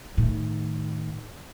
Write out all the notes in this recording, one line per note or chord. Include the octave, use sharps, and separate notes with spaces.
A2 D#3